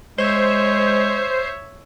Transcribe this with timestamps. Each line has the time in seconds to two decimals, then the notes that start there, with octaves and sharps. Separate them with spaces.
0.18 G#3 C5 C#5 E5